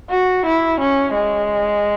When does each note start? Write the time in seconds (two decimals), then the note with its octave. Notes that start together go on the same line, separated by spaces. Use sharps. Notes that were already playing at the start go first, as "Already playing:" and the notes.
0.10 F#4
0.45 E4
0.80 C#4
1.15 G#3